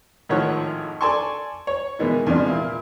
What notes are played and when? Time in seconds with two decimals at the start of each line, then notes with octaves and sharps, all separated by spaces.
0.29 G#1 A2 D#3 F3 C#5 F#5
1.01 A4 D5 G#5 A5 C6 C#6
1.67 C#5
1.99 B2 D#3 E3 G#3 A#3 B3
2.27 E2 G2 C3 F3 G#3 D4
2.47 A#2 E4 F5